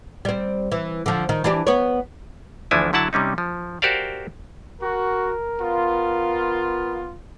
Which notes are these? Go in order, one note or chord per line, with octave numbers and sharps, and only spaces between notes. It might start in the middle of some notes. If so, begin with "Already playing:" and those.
G3 C4
E3
D3 F3
D#3
E3 D4 G4
B3 C#5
D2 E3 F3 D4 E4 G#5
D3 F#3 E4 F#5 A5
C3 G3 C#4 D#4
F3
F#4 G4 A#4 C5 D5 F5
F#4 A#4
B3 F4